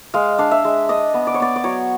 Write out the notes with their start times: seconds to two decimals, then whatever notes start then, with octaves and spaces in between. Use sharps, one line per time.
0.14 G#3 F5
0.39 D4 F5
0.51 E5
0.65 G#3
0.89 D4 D#5
1.14 B3
1.27 D5
1.34 C#5
1.40 B3 D5
1.56 D5
1.64 F#3 C#5